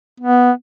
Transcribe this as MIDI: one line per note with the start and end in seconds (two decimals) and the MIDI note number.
0.20 0.51 59